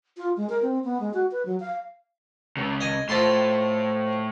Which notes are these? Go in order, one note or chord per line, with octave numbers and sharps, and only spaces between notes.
F4
G#3
A#4
C4
B3
G#3
F#4
B4
F#3
F5
C#2 C#3
D#5 G#5
A2 F3 A5 C6